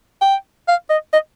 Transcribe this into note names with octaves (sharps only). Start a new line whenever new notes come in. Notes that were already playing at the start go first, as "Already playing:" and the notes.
G5
F5
D#5
D#5